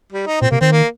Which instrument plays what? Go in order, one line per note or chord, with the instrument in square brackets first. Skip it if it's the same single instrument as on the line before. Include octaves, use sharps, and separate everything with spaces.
[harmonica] G3
D#4
[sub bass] A#2 [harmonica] C4
[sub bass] C3 [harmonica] A#3
[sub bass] D#3 [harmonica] C4
[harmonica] A#3